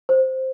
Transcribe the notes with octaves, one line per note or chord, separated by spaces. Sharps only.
C5